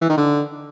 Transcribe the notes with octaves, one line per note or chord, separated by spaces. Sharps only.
E3
D#3
D3